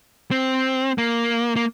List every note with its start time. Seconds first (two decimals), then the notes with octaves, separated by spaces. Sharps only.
0.31 C4
0.98 A#3
1.56 A#3